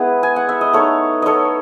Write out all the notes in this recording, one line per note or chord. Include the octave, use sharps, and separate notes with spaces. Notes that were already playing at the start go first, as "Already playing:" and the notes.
Already playing: G#3 B3 E4 G#4 B4
G#5
F#5
E5
D#5
A3 D#4 A4 C#5
A4 C#5 D#5